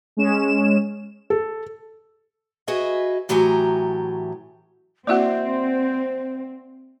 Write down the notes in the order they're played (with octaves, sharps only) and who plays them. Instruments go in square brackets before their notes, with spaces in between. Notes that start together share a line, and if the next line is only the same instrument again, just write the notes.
[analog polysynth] G#3 C#4 E7
[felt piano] A4
[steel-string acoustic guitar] F#4 G#4 B4 D#5 E5
A2 E3 F#3 G4 G#5 A#5
[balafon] A#3 E4 F#4 [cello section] C4 [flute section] C5 [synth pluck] D5 E5 F#5